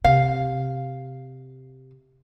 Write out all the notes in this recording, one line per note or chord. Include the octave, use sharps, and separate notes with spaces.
C3 F5